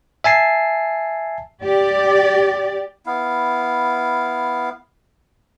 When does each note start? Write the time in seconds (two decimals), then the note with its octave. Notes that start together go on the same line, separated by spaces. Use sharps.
0.24 E5 G#5 A5 C7
1.61 G4 D5
3.06 B3 E4 F5